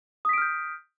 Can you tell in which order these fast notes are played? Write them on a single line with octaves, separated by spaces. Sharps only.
D#6 B6 D7 F6 G6